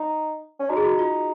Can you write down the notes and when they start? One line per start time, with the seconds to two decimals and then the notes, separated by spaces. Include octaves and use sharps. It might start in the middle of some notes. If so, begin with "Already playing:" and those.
Already playing: D#4
0.59 C#4
0.70 D#4 F#4
0.77 G#4
0.84 F#4
0.99 F4